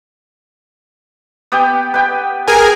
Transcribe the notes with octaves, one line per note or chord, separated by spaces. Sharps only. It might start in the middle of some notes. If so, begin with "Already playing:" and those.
B3 G4 G5
B4 G5
G#4 A#4 G#5